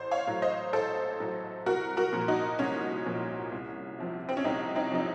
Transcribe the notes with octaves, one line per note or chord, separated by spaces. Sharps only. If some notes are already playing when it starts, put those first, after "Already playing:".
Already playing: A1 C5
C#5 F5
A2 F#3
C5 D#5
A1 A4 C5
A2 F#3
C2 F#4 A#4
F#4 A#4
A#2 F3
D#4 F#4
C2 C#4
A#2 F3
C2
C3 F3
C4
C#4
C2 C4 D#4
C4 D#4
C3 F3 D#4